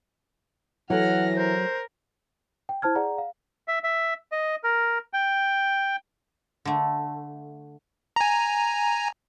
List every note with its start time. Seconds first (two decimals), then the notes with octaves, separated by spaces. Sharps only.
0.90 E3 F#3 A4 F#5 F6 A#6
1.36 A#4 C5
2.69 G5
2.82 E4 C5 A5 F6 G#6
2.95 G#4 D5 F#5 A#5
3.18 F5
3.68 E5
3.84 E5
4.32 D#5
4.64 A#4
5.13 G5
6.65 D3 A3
8.16 G#5 A#5